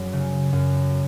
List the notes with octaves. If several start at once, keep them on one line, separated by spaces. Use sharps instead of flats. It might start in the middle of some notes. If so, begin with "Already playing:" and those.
Already playing: F#2 F#3 G#4
C#3
F#2